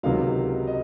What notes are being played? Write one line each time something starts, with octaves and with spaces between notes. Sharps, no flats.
C#2 C3 D#3 F#3 F5
D#5